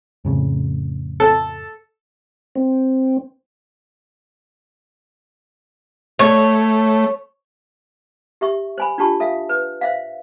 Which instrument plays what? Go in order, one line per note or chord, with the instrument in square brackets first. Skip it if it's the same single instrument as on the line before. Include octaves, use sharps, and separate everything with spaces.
[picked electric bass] F2 A2 C#3
[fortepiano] A4
[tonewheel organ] C4
[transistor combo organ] A3 [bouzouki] C#5
[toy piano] G4 E5 C#6
C5 G#5 B5
D4 F4 G4 A5 C#6
A4 E5 F5
B4
C5 E5 F5